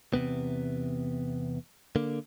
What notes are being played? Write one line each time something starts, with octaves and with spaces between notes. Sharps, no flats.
E2 G#2 C3 B3
D3 A#3